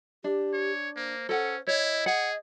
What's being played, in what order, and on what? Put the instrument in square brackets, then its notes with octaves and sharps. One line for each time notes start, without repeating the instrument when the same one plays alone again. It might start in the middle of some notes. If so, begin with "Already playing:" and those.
[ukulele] D4 [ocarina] G4
[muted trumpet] C#5
[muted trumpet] A#3 [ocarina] C5
[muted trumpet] C#4 [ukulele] A4 F#5
[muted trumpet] E4 [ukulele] C#5 [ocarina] D#5
[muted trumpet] G#4 [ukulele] F#5